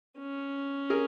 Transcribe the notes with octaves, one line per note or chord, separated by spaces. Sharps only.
C#4
G#4 A#4